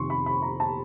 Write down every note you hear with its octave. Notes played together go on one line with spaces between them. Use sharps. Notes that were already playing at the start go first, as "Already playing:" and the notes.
Already playing: F2 C3 D#3 C6 C#6
B5
B5
A#5
A5